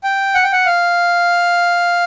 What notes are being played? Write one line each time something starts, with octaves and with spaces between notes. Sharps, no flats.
G5
F#5
G5
F#5
F5